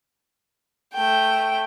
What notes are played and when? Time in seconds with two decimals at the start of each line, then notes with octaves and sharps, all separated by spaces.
0.93 A3 G5